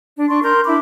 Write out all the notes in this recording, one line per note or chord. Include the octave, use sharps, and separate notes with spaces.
D4
D4 C6 C#6
A#4 C6 G6
D4 E4 B5 D6